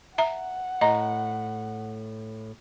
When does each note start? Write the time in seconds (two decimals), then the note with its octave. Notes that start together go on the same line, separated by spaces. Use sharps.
0.18 E5 F#5 A#5
0.81 A2 D#5 A#5 C6